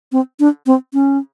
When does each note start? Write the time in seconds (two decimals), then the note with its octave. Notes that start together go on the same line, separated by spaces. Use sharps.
0.12 C4
0.40 D4
0.66 C4
0.93 C#4